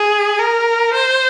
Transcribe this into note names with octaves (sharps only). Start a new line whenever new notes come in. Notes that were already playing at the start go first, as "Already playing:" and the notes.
Already playing: G#4
A#4
C5